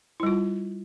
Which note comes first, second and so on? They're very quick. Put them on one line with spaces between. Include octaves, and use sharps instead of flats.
E4 G3 F4